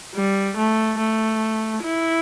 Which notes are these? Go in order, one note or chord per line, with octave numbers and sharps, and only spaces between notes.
G3
A3
A3
E4